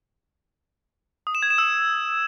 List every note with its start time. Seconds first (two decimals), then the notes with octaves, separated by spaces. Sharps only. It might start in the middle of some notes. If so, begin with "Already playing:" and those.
1.27 D#6
1.35 E7
1.43 G#6
1.50 E7
1.58 E6